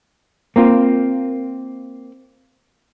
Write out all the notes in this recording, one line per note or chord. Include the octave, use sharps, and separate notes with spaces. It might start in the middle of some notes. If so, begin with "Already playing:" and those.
A#3 C4 F4